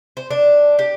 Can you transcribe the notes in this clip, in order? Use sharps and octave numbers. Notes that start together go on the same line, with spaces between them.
C5
D4
G4